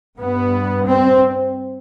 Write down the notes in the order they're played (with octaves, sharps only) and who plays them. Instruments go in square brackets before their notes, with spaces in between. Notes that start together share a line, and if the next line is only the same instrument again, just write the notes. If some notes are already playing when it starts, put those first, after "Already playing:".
[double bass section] G2 B3
C4